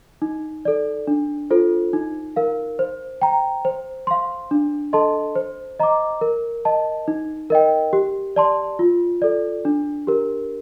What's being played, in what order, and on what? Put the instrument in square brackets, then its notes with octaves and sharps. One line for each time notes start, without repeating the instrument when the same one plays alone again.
[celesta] D#4
A4 D5
D4
F4 A4 C5
D#4
A#4 F5
C5
G5 A#5
C5
F5 C6
D4
A4 D#5 A5 C6
C5
D#5 A#5 D6
A#4
D#5 A5
D#4
A#4 D#5 G5
G4
D5 A5 C6
F4
A4 D5
D4
G4 A#4